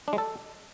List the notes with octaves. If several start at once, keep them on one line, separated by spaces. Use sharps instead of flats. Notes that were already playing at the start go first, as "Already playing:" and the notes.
D4
G#3
A4